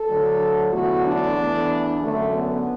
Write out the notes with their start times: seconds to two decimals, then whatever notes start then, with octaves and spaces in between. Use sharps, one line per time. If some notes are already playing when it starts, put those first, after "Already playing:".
Already playing: A4
0.08 D2 D3 F#3
0.72 E2 D3 F#3 A3 F#4
1.05 D4
1.37 E2 E3 A3
2.01 F#2 D3 F#3 A3
2.33 B3